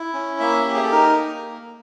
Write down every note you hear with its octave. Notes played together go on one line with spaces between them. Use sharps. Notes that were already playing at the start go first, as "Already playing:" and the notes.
Already playing: E4
C#4
A#3 E5
G4
G#4
A4
D#4 A#4
A#3